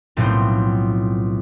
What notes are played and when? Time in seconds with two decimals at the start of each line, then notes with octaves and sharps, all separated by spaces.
0.17 B1 A2 F3 C4